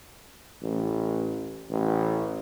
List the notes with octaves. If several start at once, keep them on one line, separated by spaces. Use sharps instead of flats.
A1
A1